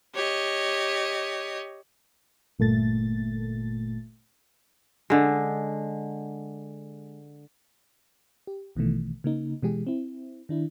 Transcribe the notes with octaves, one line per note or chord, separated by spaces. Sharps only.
G4 C#5 D#5
G1 A#2 A3 A6
D3 G#3
G4
A#1 B2 D#3 E3 A3
C#3 A#3 D#4
B2 E3 G#3 G4 G#4
C4 E4
D#3 D4 E4